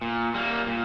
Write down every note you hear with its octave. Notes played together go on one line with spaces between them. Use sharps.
A#2
G3 A#3
A#2